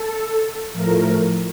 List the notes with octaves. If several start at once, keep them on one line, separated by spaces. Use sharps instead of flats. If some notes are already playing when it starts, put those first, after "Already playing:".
Already playing: A4
A2 F3 A3 A#4